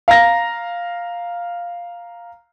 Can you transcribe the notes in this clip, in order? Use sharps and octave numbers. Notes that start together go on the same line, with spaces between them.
F5 A#5 A#6